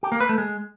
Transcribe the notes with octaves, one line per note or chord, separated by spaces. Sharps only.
G4
A#3
B4
A3
G#3